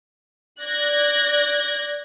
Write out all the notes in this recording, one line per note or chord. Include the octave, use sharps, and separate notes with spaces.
D5 F#6 G#6 A#6